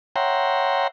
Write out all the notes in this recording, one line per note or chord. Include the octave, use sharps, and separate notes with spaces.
C#5 E5 F#5 G5 A#5 C6